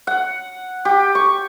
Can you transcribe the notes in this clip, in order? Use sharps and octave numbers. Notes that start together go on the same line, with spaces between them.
F#5
G4
C#6